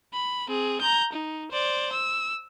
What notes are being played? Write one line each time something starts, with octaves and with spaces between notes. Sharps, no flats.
B5
C4 G#4
A#5 G6
D#4
C5 D5
E6